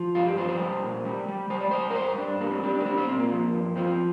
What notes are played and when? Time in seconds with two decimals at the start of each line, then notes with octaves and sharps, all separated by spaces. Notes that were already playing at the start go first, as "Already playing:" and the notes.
Already playing: F3
0.15 G2 F4
0.26 G4
0.37 F3 C5
0.49 C5
0.60 G3
0.83 A#2
1.05 G3
1.28 G3
1.50 G3 C5
1.60 D5
1.71 G3 C5
1.91 A#4
1.95 G2 C5
2.18 G2 D4
2.40 G3 A#3
2.52 C4
2.63 G3 D4
2.75 D4
2.80 A#3
2.85 G3 C4
2.98 C4
3.08 A#2 C4
3.20 A#3
3.31 F3
3.53 G2
3.76 F3 C4